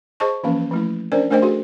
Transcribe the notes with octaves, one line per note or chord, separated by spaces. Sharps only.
G#4 C5 D#5 A5 C#6
E3 F3 A#3 C#4
F3 A3 E4
C#4 D4 A#4 C5 D5
A3 D4 A#4 C5 D#5 G5
F#4 G#4 A4